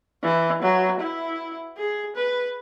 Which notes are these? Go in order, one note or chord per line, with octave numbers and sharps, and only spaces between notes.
E3
F#3
E4
G#4
B4